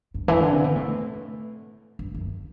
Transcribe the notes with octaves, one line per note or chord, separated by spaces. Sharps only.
G2
E3
D3
C3
B2
A2
G2
F#2